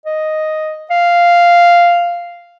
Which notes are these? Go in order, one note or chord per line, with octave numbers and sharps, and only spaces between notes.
D#5
F5